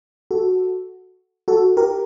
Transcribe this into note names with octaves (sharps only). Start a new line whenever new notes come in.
F#4 A4
F#4 A4
G4 A#4